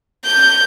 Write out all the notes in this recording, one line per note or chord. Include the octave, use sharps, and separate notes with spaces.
G6